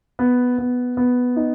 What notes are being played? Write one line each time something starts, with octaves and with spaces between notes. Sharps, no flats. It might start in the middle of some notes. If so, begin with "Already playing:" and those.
B3
B3
B3
D#4